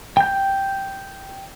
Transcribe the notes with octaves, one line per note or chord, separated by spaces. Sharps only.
G5 G6